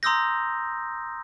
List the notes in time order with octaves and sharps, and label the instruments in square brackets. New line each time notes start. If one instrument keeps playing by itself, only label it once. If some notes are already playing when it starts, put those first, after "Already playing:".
[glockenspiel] A#5 C6 D#6 E6 G6 A#6